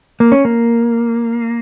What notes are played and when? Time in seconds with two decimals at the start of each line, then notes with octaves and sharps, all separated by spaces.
0.20 A#3
0.32 C#4
0.45 A#3